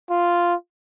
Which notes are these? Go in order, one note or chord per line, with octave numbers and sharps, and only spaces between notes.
F4